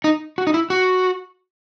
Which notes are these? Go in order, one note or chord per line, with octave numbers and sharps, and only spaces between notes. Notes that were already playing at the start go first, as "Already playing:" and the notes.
D#4
F#4
D#4
E4
F#4